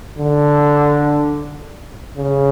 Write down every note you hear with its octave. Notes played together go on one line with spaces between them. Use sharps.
D3
C#3